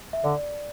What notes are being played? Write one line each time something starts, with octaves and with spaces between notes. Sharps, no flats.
E5
D3 D5